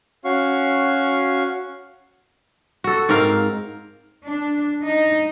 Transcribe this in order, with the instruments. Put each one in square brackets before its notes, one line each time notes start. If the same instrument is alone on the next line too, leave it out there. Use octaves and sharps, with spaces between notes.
[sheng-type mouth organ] C#4 F#4 F5 C#6
[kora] F#4 A4
G#2 C4 A#4 F5
[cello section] D4
D#4